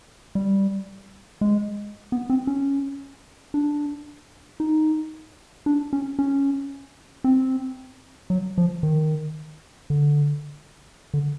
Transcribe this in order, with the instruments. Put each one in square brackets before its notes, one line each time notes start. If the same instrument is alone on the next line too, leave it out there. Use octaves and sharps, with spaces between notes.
[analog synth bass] G3
G#3
B3
C4
C#4
D4
D#4
D4
C#4
C#4
C4
F#3
F3
D#3
D3
D3